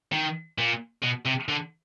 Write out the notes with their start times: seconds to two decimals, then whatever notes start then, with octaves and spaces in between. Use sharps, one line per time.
0.12 D#3
0.58 A#2
1.03 B2
1.26 C3
1.49 D3